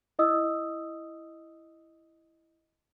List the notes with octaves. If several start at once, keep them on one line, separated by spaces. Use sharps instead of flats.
E4 D#5 D#6 E6